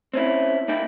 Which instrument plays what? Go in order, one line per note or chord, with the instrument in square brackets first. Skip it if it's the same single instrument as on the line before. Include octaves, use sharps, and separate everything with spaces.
[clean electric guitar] C4 C#4 E4
A#3 D#4 E4 G5